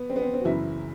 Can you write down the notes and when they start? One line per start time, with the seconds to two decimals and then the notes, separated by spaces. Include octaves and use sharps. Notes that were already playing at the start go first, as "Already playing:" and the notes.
Already playing: B3
0.09 C4
0.16 B3
0.22 C4
0.33 C4
0.41 F#4
0.45 F#1 F#2 E3 E4